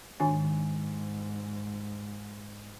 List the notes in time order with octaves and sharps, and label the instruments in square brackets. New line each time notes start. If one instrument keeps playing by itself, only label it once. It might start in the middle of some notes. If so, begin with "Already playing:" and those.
[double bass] G#2 [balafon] D#3 D4 G#5